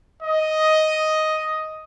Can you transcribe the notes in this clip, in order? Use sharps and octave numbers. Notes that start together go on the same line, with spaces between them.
D#5